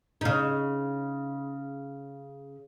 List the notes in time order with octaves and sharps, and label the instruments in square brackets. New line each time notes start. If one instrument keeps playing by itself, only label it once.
[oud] C#3 D#4